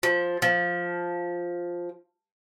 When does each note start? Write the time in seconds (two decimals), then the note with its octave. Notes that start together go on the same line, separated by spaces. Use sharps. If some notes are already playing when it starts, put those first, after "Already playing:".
0.03 F3
0.42 F3